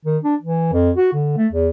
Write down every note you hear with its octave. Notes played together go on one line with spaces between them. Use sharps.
D#3
D4
E3
F2
F#4
D3
A3
E2